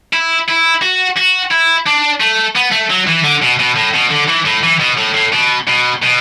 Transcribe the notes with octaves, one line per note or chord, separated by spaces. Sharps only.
E4
E4
F#4
F#4
E4
D4
A3
B3
A3
F#3
E3
D3
B2
B2
A2
B2
D3
E3
A2
E3
B2
A2
A2
B2
B2
B2